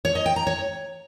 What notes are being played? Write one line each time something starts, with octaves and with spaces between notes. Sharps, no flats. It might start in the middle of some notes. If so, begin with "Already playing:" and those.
C#5
D#5
G5
A#5
C#5